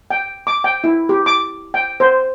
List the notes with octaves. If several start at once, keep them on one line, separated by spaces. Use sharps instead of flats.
G5
D6
G5
E4
G4
D6
G5
C5